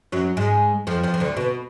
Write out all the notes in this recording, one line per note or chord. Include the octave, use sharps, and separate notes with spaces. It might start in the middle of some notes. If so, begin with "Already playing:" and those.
F#2 F#3
G#2 G#3
F2 F3
F2 F3
F3
D2 D3
B2